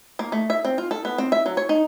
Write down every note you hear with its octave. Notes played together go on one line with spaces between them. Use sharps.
A#3
A3
E5
C4
F4
A4
B3
C4
E5
F#3
C#5
D#4